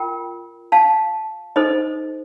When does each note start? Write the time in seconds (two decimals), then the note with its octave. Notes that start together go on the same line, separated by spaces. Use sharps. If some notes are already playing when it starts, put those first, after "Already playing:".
Already playing: F4 A#4 G5
0.72 F5 A5
1.56 D#4 A4 C5 D#5